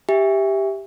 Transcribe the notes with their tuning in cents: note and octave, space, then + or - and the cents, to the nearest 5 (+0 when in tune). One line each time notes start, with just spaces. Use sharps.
G4 +0 E5 +0 G#5 -35